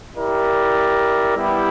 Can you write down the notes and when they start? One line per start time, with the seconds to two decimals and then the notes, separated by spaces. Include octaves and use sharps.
0.16 E4 G4 A#4 D5
1.35 G3 B3 E4 G4